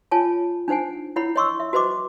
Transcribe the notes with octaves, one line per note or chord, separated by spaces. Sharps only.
F4 C#5 G#5 A5
D4 D#4 C5 F#5 G#5
E4 C#5 F#5 B5
C#5 D#5 C6 C#6 E6
E5
F#4 B4 C5 D#5 C6 D6